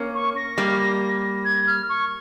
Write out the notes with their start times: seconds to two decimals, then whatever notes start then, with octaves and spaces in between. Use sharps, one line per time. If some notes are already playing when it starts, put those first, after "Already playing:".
Already playing: A#3 C#4
0.15 C#6
0.36 A#6
0.58 G3 A#3
1.45 G#6
1.67 F6
1.89 C#6